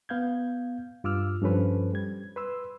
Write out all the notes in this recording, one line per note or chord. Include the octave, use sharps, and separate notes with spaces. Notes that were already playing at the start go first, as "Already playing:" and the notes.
B3 F5 G6 G#6
G2 F4 D6 E6 F6
G2 F3 C#4 A4 B4 C5
G3 G#6
B4 C6 E6